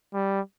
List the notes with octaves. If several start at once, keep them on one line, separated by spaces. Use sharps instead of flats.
G3